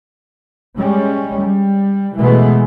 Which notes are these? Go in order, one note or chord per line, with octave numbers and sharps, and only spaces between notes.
G3 G#3 C#4
G3
B2 E3 G#3 A3 B3